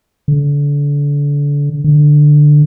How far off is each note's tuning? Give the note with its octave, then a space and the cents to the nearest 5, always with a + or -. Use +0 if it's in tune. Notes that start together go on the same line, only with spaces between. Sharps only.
D3 -30
D3 +10